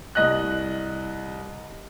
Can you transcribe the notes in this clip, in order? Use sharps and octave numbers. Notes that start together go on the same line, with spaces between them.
C2 D#5 F#6